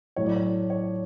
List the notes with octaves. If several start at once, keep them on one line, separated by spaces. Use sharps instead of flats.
A2 F#3 A3 C#5
D5
C#5
C#5